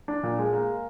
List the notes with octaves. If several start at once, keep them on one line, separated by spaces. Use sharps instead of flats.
D4
A#2
G#3
A#3